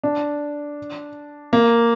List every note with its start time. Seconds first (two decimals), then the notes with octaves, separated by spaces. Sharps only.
0.04 D4
1.53 A#3